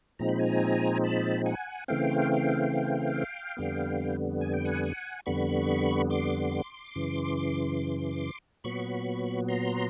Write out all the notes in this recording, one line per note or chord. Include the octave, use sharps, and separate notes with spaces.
A#2 F3 G#3 C4 D#4 A#5
B5
G#5 A#5
A5 B5
F#5 G#5
C#3 E3 A3 C4 F5 G5
F2 D3 G3 B3
G#5
G5
F#5 G#5
F2 D3 G3 B3 B5 C#6
C6 D6
F#2 C#3 E3
A#2 F#3 B3 B5 C#6
A#5 C6